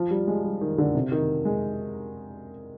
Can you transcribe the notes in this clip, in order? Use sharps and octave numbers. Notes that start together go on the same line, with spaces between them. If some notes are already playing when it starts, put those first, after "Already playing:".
Already playing: F3
G3
G#3
G3
D#3
D3
C3
D#3
G#3